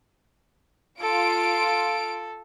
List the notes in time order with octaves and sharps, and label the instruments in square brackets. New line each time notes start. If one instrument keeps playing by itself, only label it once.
[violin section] F4 D7 [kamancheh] A4